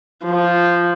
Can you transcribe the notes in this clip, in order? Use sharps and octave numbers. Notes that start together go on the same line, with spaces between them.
F3